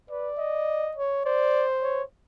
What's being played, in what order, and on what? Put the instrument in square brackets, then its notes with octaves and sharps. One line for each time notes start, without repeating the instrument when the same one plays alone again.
[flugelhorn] B4 [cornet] D5
[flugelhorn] D#5
[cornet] C#5
[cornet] C5 [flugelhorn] D5
[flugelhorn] C#5